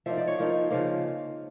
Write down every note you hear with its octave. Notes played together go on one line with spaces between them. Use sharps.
F3 A#3 D#4 E5
D5
C#5
F3 A#3 D#4
C#3 F3 A#3